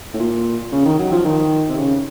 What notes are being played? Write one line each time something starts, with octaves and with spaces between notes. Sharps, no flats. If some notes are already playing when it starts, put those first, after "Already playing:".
A2
A#2
C#3
D#3
F#3
F3
D#3
C3
C#3